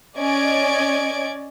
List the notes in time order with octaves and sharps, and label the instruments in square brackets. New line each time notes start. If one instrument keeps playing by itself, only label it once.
[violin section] C#4 D5 D#5 G#6 D7